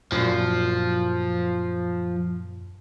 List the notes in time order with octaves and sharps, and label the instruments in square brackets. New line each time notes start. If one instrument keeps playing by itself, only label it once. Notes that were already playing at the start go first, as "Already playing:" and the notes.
[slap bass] F#2 A#2 [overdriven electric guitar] F3